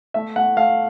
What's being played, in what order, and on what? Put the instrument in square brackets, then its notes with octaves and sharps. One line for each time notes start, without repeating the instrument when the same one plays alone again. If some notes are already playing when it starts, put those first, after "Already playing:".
[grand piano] A3 E5
A3 F#5
A3 F5